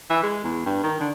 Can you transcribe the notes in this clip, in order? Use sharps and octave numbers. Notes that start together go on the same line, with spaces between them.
E3
G#3
E2
G2
D#3
D3